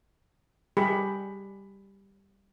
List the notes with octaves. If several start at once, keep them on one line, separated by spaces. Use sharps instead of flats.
G3 G4 G#4 B5